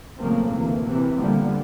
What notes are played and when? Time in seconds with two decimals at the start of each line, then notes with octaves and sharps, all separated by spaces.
0.18 C#3 F3 F#3 A3 A#3 C4
0.50 D2 C3 E3 A#3
0.84 C3 E3
1.18 D3 F3 G3 A#3 B3